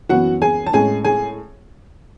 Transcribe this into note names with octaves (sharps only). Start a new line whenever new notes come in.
F#2 E3 B3 F#4 F#5
G#4 G#5
A5
A2 G#3 C#4 G#4 G#5
G#4 G#5